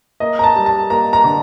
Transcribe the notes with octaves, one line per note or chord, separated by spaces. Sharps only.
A#3 D#5
A#5
A5
G3
A5
A#3 A#5
A#5
D3